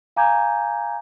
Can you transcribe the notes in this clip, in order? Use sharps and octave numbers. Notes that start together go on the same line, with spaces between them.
F5 G#5 A#5 D6 G6 G#6